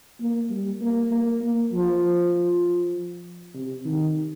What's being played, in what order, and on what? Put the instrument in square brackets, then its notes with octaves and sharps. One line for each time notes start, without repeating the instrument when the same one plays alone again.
[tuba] A#3
G3
A#3
A#3
A#3
F3
C3
D#3